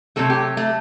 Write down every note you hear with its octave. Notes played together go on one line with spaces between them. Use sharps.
C3 F#3 A3 A4
G4
A3